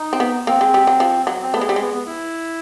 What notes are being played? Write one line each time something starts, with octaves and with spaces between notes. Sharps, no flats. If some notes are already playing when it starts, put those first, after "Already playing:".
Already playing: D#4
C4
B3
A#3 C4
G#3
G3
F#3
F3
F#3
C4
A3 B3
G#3
G3 C4
G#3 B3
B3
E4